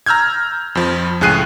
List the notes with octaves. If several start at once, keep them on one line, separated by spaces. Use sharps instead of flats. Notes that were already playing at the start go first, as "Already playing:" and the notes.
A#5 E6 F6 G6 G#6
F2 F3
C#2 A2 G#4 F#6 C7 D#7